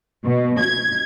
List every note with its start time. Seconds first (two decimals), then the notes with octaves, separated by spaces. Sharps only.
0.24 B2
0.59 G#6